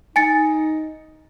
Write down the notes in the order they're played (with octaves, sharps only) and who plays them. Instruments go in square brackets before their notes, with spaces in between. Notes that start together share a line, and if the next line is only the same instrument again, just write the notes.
[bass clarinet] D#4 [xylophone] G#5 A6 C#7